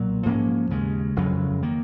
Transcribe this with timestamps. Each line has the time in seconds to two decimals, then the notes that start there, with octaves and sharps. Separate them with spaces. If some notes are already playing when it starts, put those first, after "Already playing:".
Already playing: B1 A#2 F#3
0.26 G#2 F3 A#3 C#4
0.70 D#2 C#3 G#3
1.16 F#1 F2 C#3 F#3
1.62 D#3 A#3